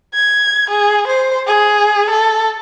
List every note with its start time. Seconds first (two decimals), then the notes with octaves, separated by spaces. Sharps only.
0.14 G#6
0.70 G#4
1.07 C5
1.47 G#4
2.10 A4